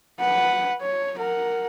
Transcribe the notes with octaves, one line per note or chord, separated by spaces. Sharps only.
B4 F#5
C#5
A#4 F#5